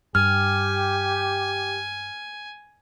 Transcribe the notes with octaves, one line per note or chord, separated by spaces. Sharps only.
G2 G4 G#5 F6